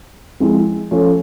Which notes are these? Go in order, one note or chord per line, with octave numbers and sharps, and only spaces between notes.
F3 G#3 C4 E4 G#4
F3 A3 C#4